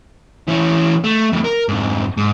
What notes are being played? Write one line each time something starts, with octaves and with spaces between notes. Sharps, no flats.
E3 C#4
A3
F2 A2
A#4
F2 G#2
G#2